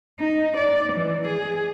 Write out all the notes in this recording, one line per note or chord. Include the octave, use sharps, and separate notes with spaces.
D#4
D5
E3
G#4